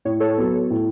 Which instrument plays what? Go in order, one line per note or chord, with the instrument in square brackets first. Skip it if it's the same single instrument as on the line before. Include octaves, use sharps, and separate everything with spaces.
[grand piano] A2 [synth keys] C#5
[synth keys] A4 C#5
[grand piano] F#3 B3
A2